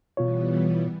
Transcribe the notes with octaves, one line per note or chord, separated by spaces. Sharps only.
B2 E3 G3 B3 F4 C#5